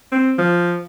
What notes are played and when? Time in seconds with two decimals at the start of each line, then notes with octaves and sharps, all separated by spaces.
0.12 C4
0.38 F3